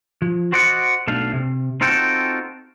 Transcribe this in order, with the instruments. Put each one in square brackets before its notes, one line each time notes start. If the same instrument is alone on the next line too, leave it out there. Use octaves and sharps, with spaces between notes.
[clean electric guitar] F3
F#4 C5 D5 D#5 F#5
B1 A3 D4 F5
C3
C4 D#4 F4 F#4 A4 G5